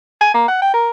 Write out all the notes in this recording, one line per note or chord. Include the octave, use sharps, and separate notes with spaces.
G#5
A#3
F#5
G5
A#4